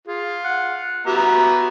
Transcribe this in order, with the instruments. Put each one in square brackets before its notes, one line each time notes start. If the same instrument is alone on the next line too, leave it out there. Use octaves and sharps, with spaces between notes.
[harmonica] F4 [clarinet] G#4
[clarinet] F#5
[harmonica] B3 E5 A#5 [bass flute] F#4 [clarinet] G4